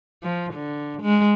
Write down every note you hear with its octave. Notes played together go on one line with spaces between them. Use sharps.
F3
D3
G#3